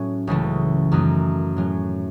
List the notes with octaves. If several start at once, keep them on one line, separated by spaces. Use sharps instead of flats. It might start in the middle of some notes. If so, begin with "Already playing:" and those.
Already playing: A2 F#3 C#4
C#2 C#3 E3 A3
F#2 D#3 F#3 A3 D#4
A2 F#3 C#4